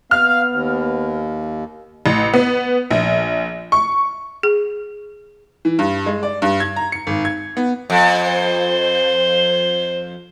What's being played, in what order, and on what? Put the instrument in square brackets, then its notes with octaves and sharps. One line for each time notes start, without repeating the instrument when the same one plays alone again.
[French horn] B3 [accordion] F5 [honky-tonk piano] F6
[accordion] D#2
[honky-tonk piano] A1
B3
A#1
C#6
[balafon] G#4
[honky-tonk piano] E3
G2
G#3
D5
G2
G#6
A#5
C#7
G#1
G#6
B3
[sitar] F2
[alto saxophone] C5